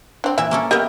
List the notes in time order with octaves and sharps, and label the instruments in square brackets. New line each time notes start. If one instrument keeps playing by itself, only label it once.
[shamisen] C4 D4
[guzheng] A#2 E3 [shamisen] E5
[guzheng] A#3 C#4 A4
[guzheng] B3 E5 G5 [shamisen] G4 A#4 D#5